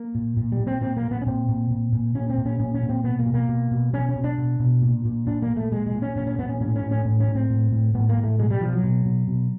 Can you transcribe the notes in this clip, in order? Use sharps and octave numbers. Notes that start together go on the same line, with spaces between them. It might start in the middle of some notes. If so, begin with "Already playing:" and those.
Already playing: A#3
A#2
A#2
G3
A#2
C4
A#2 C4
A#3
A#2
B3
C#4
A#2 C4
A#2
A#2
A#2
A#2 C#4
C4
A#2
C#4
A#2 C#4
C#4
A#2
C4
B2 B3
A#3
B2
A#3
B2
B2
B2 C#4
C#4
B2
D4
B2
B2
A#2
A#2
A#2 D4
A#3
A#2
A3
A#2 G#3
G#3
A#2
C#4
A#2 C#4
C#4
A#2 B3
C#4
A2 C#4
C#4
A2
C#4
A2 C#4
C#4
A2
C4
A2
A2
A2 B3
A#3
A2
A3
B2 G#3
G3
B2 F3
F#3
B2
B2
B2